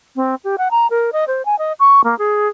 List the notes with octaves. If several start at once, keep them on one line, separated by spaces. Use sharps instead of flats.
C4
G4
F#5
A#5
A#4
D#5
C5
G#5
D#5
C#6
A#3
G#4